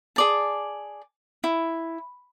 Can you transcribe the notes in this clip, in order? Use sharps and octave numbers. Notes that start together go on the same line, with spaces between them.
G#4 D5 A5
E4